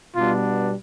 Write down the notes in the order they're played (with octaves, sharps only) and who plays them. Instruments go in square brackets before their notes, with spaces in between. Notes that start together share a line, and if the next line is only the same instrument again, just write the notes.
[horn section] B2 G3 B3 D4 F4